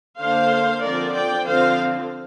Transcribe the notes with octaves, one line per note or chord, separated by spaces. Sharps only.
D3 A#3 D4 C5 F5
D3 F3 C4 A#4 D5
D5 G5
D3 F3 C4 C5 F5